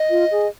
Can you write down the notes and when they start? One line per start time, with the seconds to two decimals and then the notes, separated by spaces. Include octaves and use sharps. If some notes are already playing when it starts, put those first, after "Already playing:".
Already playing: D#5
0.10 F4
0.31 G#4